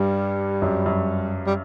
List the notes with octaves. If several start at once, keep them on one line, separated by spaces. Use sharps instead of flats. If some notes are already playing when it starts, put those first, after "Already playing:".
Already playing: G2 G3
F#2
F#2
G3